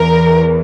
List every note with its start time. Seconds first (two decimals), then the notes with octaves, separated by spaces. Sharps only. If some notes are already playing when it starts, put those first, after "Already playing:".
Already playing: E2 E3 A#4